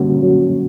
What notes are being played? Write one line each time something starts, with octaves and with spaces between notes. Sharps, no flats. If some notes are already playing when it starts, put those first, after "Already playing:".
Already playing: D3 G3 A#3 C#4 F#4
F#3